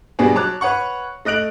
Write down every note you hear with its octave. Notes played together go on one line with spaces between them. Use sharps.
B2 G3 B3 D4 F#4 G#4
F#3 C#5 A5 D6 F#6
B4 C#5 F#5 C#6
A3 D#5 F#6 D7 F#7